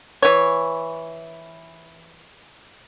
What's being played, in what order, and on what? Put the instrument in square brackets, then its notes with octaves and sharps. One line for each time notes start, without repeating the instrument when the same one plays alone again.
[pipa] E3 C#5